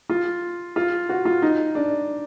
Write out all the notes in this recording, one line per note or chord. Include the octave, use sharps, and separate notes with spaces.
F4
F4
F#4
F4
D#4
D4